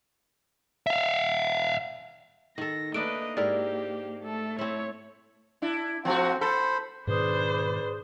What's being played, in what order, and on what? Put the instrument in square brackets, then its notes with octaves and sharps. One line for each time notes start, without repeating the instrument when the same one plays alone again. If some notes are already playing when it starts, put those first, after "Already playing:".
[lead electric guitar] E5 F5
[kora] D#3 A4 [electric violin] A#6
[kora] A3 D4 D#4 [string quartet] A#3 [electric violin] B4 D#5 [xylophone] D7
[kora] G#2 E4 A#4 [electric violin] G4 [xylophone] D5
[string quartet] A3 [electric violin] A4
[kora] C4 E4 [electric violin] C#5
[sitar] D4 E4
[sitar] F3 A3 F#4 [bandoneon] C4
[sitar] A4 [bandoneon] C5 B5
[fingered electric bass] G#2 B2 D#3 [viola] D4 C5 [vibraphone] G#4 D#6 [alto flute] B4